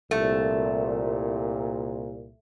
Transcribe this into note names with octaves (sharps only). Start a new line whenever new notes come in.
C2 A#2 A3